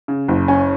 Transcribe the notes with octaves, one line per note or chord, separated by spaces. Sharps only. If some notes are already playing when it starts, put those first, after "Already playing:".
C#3
F#1
C#4 G#5